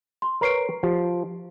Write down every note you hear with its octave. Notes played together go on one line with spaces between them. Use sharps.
C6
A#4 B4 C#5 C7 D7
F3 G4